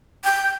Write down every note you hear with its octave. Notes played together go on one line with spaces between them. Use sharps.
G5